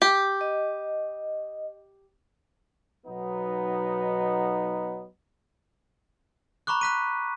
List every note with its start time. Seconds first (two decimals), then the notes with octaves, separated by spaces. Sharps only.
0.02 G4
0.41 D#5
3.06 B1 F#3 B3 D#4
6.67 A#5 B5 C#6 D6 F#6
6.81 F#6 B6 D#7